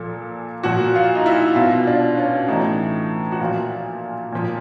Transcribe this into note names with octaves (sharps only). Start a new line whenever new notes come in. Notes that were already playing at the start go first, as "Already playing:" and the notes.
Already playing: A#2 F3 A4
A#2 F3 F#4
F4
D#4
E4
B2 F4
D4
C#4
A2 E3 D#4
F#4
A#2 F3 F4
A#2 F3